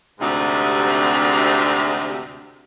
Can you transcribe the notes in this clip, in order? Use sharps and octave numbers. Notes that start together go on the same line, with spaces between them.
D2 G#2 C3